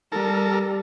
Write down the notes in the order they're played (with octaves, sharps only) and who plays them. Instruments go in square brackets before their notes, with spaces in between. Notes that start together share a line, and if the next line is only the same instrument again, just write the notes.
[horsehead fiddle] G3 [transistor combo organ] A4 A#4